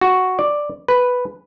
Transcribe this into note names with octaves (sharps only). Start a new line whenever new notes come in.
F#4
D5
B4